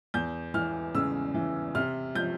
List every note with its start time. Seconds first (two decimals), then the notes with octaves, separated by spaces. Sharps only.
0.14 E2 G6
0.54 E3 F6
0.94 C#3 E6
1.34 E3
1.75 C3 F6
2.15 F3 G6